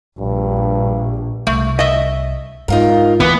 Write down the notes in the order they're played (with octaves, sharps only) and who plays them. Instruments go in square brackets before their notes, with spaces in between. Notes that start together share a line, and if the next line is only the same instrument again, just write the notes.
[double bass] A#1 [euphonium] G2
[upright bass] C2 [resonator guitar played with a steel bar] A3
[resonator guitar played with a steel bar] D#5 E5
[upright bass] G#2 [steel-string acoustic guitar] D#4 F4 A#4
[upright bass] D2 [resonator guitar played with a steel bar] E3 [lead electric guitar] B3